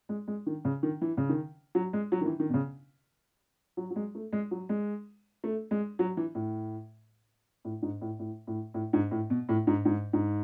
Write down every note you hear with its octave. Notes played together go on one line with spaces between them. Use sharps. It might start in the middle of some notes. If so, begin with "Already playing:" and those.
G#3
G#3
D#3
C#3
D#3
E3
C#3
D#3
F#3
G#3
F#3
D#3
E3
D#3
B2
C#3
F#3
F#3
G#3
A3
G#3
F#3
G#3
A3
G#3
F#3
E3
A2
A2
G#2
A2
A2
A2
A2
G#2
A2
B2
A2
G#2
G#2
G#2